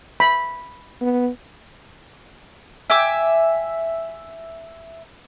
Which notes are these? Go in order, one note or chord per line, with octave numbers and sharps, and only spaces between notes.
B5
B3
E5 G5 G#5 D6